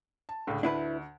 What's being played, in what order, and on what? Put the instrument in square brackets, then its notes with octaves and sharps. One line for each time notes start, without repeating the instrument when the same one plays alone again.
[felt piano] A5
C#2 A2 D3
[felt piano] D2 [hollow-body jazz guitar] D4 E4 B4